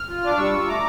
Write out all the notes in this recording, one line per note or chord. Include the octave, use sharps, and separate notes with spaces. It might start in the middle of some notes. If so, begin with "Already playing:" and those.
Already playing: F6
F4
D4 D6
G3 C#6 E6
F4
A3 A#5 D6